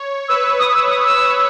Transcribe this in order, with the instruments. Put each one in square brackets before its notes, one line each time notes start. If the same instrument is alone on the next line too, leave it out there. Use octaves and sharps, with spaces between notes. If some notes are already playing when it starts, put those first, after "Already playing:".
Already playing: [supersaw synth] C#5
[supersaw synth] B4 [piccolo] E6
[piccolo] E6
D#6
E6
D#6
E6